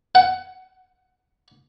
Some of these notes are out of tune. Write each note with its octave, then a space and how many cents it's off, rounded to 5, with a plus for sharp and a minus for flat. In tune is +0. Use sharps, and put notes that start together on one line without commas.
F#5 +20